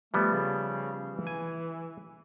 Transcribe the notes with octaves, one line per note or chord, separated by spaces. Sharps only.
F3 G3 A3 B3
C#3
E3
G#5